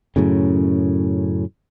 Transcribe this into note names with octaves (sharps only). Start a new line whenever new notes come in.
F#2 A2 C#3